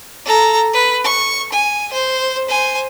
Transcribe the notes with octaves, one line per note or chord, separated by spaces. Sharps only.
A4 A#5
B4
C#6
G#5
C5
C5 G#5